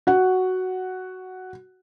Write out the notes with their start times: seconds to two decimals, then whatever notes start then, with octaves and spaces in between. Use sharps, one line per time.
0.07 F#4 F#5